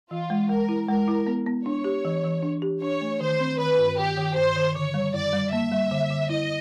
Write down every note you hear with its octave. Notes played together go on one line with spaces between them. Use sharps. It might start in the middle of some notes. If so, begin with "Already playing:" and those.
E3 F4
G#3
G#3 A#4
E4
G#3 A#4
E4
B3
B3
D4 C#5
G4
E3
E3
D4
G4
D4 C#5
A3
D#3 C5
C4
D#3 B4
G2
D#3 G4
D#3
G2 C5
D#3
D3 C#5
G3
F#2 D5
G3
A#3 E5
G3
D3
D3
E4 D#5